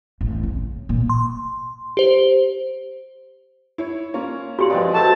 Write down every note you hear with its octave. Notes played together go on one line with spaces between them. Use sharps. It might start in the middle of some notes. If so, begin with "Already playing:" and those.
A1
C#3
A#2
C6
G4 C5
E4 C#5
A#3 C#4 F4
A#2 F#4 G4 C6
F3 G#3 C4 B4 D5
F#3 A4 B4 C5 D5 E5 A5